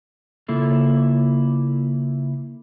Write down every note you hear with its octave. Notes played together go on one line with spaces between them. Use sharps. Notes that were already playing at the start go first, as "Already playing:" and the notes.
C#3 A#3 E4 F4 A4